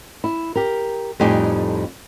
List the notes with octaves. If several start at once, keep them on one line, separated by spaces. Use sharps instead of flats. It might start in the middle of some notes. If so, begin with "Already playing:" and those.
E4
G4 A#4
F2 A2 G3 D#4 G4 G#5